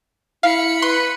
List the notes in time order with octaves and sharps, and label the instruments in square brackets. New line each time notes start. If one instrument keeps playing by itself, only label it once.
[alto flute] E4 [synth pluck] F5 [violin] B5 C#7
[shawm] B4 [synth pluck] C6